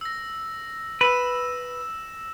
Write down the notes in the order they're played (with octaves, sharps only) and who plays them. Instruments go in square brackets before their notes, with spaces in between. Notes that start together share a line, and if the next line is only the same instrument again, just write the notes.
[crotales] E6 A#6
[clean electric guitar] B4 [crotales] E6 E7